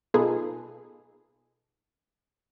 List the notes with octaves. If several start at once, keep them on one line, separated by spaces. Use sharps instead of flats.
B2 D#4 F4 G#4 A4 B4